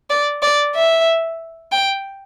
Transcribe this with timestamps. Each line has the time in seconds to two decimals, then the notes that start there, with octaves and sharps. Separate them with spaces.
0.10 D5
0.42 D5
0.75 E5
1.72 G5